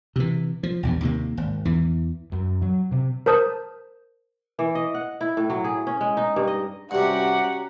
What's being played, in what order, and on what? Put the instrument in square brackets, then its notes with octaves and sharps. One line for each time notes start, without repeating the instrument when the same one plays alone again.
[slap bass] C3 E3
F3
A#1 E2 G2
D#2 C3 A#3
G#1
E2 E3
[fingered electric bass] F#2
F#3
C3
[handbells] A#4 C5 A5 D#6 G6
[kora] E3
D#5
F#5
E4
A2
F#3
G#4
C#4
G#3
D#4
G2
D#5
[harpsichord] G2 C3 [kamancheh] C#4 F#4 [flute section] G4 A#5 [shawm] F#5